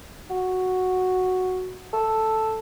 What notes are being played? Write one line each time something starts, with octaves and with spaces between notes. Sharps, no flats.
F#4
A4